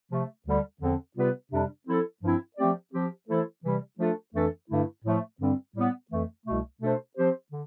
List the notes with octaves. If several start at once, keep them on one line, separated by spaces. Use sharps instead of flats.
C3 F3 A3
D2 D3 G3
E2 D3 F3 C4
C3 G3 B3 F4 B4
F2 C3 G3 D4
F3 C4 E4 A4
G2 F3 C4 E4
F3 A3 C4 G4 D5
F3 C4 G4
E3 A3 E4 A4 C5
C3 E3 G3
F3 A3 D4 F4 A4
F2 E3 A3 D4 A4
G2 D3 A3 E4
A2 F3 A3
G2 D3 G3 C4
A2 G3 B3
F2 E3 A3
C2 B2 A3
B2 A3 D4 A4 C5
F3 C4 G4 C5
D3